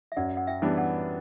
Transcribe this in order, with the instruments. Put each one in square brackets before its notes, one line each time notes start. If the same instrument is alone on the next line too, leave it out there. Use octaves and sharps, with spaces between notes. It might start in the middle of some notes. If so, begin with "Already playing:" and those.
[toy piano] E5
[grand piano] F#2 [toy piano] D5 F#5
[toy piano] F#5
E5 G5
[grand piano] E3 G3 B3 D4
[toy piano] F#5 A5